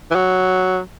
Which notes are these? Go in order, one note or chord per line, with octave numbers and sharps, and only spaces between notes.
E3
F#3